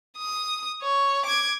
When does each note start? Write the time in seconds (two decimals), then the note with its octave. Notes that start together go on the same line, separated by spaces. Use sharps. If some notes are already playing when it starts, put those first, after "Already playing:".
0.18 D#6
0.82 C#5
1.26 D6 G#6